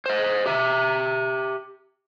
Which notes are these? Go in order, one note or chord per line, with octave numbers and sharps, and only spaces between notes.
C5 D#5
G4 E5